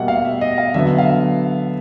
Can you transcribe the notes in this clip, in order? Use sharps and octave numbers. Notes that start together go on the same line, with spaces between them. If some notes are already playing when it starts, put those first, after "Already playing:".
Already playing: B2 G3 A#3 E5 F#5
F5
E5
D#5
F5
D3 F#3 B3 E5
F5